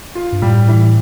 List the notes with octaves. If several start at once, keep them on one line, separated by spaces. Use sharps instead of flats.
F4
G2
A2 G3
E3